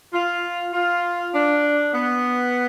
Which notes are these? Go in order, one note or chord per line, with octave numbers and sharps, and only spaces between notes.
F4
F4
D4
B3